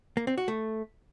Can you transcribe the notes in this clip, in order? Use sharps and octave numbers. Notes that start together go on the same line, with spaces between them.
A#3
C4
F#4
A3